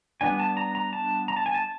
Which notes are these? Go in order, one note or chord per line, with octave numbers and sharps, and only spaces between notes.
G3 B3 D4 G#5
A5
A#5
A#5
A5
A#5
A5
G#5
A5